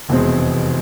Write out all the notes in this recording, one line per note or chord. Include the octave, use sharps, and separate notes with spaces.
F1 E2 B2 G#3 C4